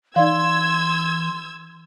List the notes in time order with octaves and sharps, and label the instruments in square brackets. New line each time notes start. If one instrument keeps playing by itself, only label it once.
[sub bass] E3 [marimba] D#4 D5 F5 [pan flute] C6 [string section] E6 G#6